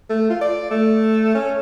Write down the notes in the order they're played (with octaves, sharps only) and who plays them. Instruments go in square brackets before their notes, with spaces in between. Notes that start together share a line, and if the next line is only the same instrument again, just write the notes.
[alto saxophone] A3
F4
D5
A3
C#4